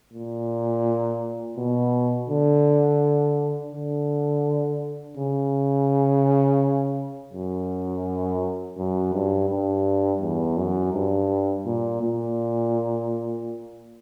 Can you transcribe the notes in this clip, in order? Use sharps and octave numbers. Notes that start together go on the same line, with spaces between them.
A#2
B2
D3
D3
C#3
F#2
F#2
G2
G2
E2
F#2
G2
A#2
A#2